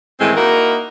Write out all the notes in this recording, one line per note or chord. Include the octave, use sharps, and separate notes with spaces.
A2 D#3 E3 G#3 C4
A#3 D#4 E4 F#4 A#4